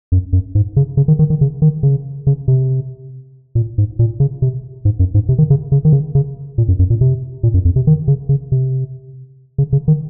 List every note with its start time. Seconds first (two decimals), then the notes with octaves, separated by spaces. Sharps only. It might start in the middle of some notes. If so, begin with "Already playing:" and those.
0.12 F#2
0.33 F#2
0.55 G#2
0.76 C#3
0.97 C#3
1.08 D#3
1.19 D#3
1.30 D#3
1.41 C#3
1.62 D#3
1.83 C#3
2.27 C#3
2.48 C3
3.55 A#2
3.78 G#2
3.99 A#2
4.20 C#3
4.42 C3
4.85 G#2
4.99 F#2
5.14 G#2
5.29 C3
5.38 D#3
5.50 C#3
5.72 C#3
5.85 D#3
5.93 C#3
6.15 C#3
6.58 A#2
6.68 F#2
6.79 F#2
6.90 A#2
7.01 C3
7.43 A#2
7.54 F#2
7.65 F2
7.76 C3
7.87 D#3
8.08 C#3
8.29 C#3
8.52 C3
9.58 C#3
9.73 C#3
9.88 D#3